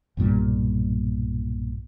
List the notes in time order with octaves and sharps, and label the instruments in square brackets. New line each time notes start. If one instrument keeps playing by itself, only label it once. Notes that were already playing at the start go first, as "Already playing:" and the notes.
[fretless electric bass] B1 G2 A#2 G3